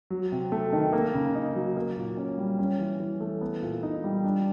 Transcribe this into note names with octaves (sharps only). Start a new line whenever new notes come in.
F#3
C3
A3
D#3
A#3
C#3
D#4
F#3
A#3
A#2
C#4
G3
C#4
E3
E3
A3
B3
A#2
D#4
G3
D4